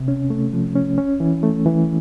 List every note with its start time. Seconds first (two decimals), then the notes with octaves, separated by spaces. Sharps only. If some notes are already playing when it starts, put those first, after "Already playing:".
Already playing: C3
0.08 C#4
0.30 A3
0.53 F3
0.75 C#4
0.98 C#4
1.20 E3
1.43 A3
1.66 E3